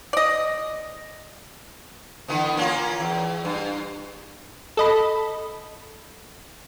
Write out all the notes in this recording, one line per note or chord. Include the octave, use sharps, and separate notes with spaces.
D5 D#5
D3 E3 B3
A#3 C#4 F4
E2
G2
A4 D#5 B5